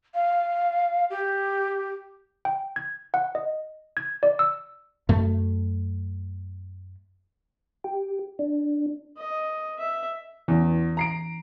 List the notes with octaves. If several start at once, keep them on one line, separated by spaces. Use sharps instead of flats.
F5
G4
G5
G#6
F#5
D#5
G#6
D5
E6
F#2 A3
G4
D4
D#5
E5
E2 E3 C#4
A#5 C7 D7